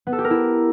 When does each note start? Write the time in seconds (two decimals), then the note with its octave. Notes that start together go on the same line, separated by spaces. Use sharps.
0.07 B3
0.13 A4
0.19 G4
0.24 A#4
0.30 E4